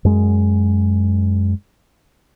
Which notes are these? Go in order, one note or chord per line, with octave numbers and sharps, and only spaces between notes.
F#2 G#3